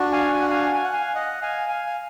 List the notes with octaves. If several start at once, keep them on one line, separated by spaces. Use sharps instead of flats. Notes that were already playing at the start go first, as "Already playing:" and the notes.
Already playing: D4 F#4
F5 G#5
G#5
F#5
F5 G#5
G#5
F#5
F5 G#5
D#5 F#5
F5 G#5
F5 G#5
F5